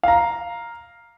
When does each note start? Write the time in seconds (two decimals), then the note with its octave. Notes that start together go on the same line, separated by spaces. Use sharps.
0.03 F5 A#5